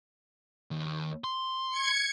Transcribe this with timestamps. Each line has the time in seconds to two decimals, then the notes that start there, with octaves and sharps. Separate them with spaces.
0.71 D#2
1.24 C6
1.70 G#6 C#7